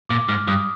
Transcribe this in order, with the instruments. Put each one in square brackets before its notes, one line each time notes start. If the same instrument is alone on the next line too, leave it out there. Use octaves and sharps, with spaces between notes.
[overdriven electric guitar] A#2 [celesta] D6
[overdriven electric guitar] G#2 [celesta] F6
[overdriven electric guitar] G2 [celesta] D#6